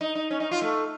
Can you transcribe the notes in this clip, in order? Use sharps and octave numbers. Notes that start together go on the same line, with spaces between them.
D#4
D#4
C#4
D#4
F4
A3